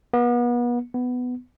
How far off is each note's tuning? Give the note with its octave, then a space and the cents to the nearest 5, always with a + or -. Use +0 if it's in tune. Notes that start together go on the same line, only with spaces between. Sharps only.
B3 -35
B3 +10